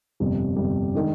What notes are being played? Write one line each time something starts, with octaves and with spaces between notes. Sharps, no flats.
G1 F2 C3 G3
G1 F2 C3 G3
D#3 G#3 D4